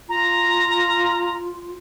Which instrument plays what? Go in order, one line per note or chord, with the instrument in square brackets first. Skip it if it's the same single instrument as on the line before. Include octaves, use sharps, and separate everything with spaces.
[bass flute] F4 [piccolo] A#5